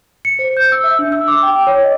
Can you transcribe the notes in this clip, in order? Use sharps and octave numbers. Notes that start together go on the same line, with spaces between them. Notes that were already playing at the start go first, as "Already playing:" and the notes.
C#7
C5
G6
E6
E5
D4
E6
D6
G5
G5
C#5
D#5